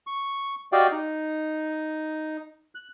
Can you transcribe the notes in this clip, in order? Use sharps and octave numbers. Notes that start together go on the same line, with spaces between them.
C#6
F#4 G4 D5 D#5 F5 G5
D#4
F#6